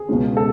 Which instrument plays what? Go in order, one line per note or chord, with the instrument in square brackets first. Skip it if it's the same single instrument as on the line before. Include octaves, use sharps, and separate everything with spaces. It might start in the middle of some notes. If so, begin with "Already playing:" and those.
Already playing: [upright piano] G#4
C#2 B2 G#3 C#4
A4